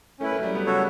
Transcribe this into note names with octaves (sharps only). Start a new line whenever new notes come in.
A3 C#4 E4 B4
A3
F#3
G3
B3
C#3 F#4 A4 C#5